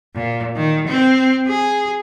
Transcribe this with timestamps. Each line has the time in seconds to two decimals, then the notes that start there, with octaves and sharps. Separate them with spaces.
0.15 A#2
0.56 D#3
0.87 C4
1.48 G#4